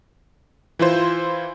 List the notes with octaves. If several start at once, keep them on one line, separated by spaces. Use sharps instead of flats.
E3 E4 F4 C5